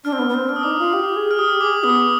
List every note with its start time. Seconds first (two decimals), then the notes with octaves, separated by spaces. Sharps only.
0.04 D4 F6
0.13 C4
0.19 B3
0.29 B3
0.34 C4
0.49 D4 F6
0.56 D#6
0.63 D#4 D6
0.71 D#6
0.79 F4
0.93 G4
1.16 G#4
1.31 F6
1.39 G4 D#6
1.61 G#4 D6
1.84 B3 D#6